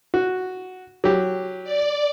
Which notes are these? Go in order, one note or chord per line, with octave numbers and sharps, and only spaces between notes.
F#4
F#3 G4
D5